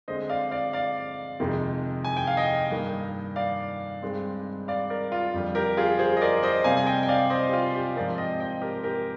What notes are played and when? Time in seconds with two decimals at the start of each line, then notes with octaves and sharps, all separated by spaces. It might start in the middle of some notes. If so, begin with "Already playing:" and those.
0.08 D3 G#3 C4 C5 D#5
0.29 D5 F5
0.51 D5 F5
0.73 D5 F5
1.40 F2 C3 D#3 G#3
2.05 G#5
2.17 G5
2.27 F5
2.37 D#5 G5
2.70 G2 D#3 A#3
3.36 D5 F5
4.02 G2 D#3 G#3 C4
4.68 D5 F5
4.90 A#4 D5
5.12 F4
5.34 F2 D3 G3
5.55 G4 A#4
5.77 F4 G#4
5.99 G#4 C5
6.17 D#5
6.21 A#4 D5
6.43 C5 D#5
6.64 C3 G3 C4 F5 G#5
6.77 G#5
6.86 D#5 G5
7.03 G5
7.08 D5 F5
7.30 C5 D#5
7.47 G4
7.53 F4
7.74 G4
7.96 G#2 F3 C4 A#4 D5
8.18 D#5 G5
8.40 D#5 G5
8.61 G4 A#4
8.83 G4 A#4